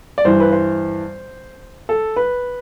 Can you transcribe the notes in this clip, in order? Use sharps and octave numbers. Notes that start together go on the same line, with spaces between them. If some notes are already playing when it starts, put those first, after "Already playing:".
D5
G2 E3 C5
B4
C5
A4
B4